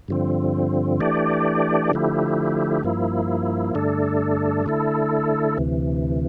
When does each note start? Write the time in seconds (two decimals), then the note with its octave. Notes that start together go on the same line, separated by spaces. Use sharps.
0.08 G2 D3 F3 C4
1.00 E3 A3 D4 G4 D5
1.91 D3 F3 A3 E4 G4
2.84 G2 F3 A#3 E4
3.75 G2 D3 A3 D4 A4
4.66 D3 A3 E4 A4
5.58 D2 C3 E3